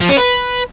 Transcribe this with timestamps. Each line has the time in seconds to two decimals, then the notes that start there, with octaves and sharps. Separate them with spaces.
0.01 F3
0.09 C#4
0.17 B4